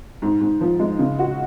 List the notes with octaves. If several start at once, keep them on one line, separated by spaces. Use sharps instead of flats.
G#2
G#2
F3
G#3
C#3
F#4